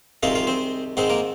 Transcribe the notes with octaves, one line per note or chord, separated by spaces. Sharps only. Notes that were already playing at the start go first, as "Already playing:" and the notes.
C2 C3 D#3 G#3 C4 F4 F5
F4 F5
C4 C5
G#2 D#3 G#3 C4 C5
A#3 A#4